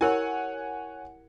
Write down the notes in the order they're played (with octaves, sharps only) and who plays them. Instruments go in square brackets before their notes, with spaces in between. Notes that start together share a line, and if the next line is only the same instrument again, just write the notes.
[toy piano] E4 G4 A#4 [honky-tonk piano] C#5 F#5 G#5